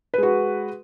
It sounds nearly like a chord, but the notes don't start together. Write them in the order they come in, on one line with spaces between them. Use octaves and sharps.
B4 G#3 F#4